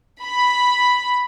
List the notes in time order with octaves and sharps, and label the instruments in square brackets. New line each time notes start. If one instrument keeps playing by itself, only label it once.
[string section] B5